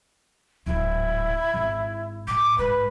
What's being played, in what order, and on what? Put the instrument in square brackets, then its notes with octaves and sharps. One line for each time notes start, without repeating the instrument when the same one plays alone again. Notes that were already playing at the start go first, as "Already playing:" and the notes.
[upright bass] D1 G#2 [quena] E4
[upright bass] G#1
[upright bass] A2 [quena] D6
[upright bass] G#2 [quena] B4